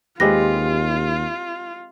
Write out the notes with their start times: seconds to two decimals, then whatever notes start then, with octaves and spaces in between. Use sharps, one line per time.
0.20 D#2 G#3 C4 F4 G4 B4 A#6